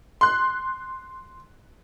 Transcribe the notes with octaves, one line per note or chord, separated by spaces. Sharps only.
C6 F#6